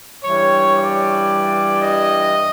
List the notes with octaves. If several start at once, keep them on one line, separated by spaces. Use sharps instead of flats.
G2 E3 G3 C#5
D5
D#5